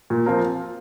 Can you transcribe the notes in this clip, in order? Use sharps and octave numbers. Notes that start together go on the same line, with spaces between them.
A#2
F3 C4 F4 A#4